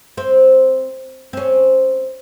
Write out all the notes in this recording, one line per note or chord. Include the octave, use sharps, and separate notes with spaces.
C4
C4 C#4